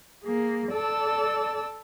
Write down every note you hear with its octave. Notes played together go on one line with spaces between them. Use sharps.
A#3 G#4
A4 D5 A5 E6